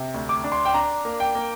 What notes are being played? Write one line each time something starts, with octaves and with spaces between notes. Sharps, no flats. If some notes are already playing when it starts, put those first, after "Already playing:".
Already playing: C3
D2
D6
D4
C6
G5
D4 A#5
A#3
G5
A#3